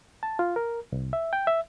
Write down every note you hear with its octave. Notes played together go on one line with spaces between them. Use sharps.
A5
F4
A#4
C2
E5
G5
E5